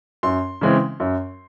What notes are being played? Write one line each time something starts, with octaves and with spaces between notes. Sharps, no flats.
F#2 C6
C#3 E3 G#3 C4
F#2